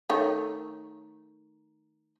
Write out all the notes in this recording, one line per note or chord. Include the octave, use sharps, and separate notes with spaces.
D#3 A3 C#5